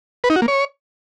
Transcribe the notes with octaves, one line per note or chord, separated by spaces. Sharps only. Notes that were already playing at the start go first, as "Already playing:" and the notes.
B4
D#4
F#4
A#3
C#5